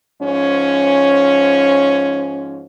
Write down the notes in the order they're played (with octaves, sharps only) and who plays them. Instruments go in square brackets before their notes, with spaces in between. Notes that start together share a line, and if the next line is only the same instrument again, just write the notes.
[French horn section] G#2 F3 C#4